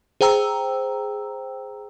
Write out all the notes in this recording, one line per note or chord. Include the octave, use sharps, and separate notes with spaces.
G#4 C5 G5 A#5 E6